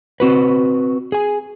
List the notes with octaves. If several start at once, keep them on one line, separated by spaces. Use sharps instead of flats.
C4 F#4 B4
G#4 G#5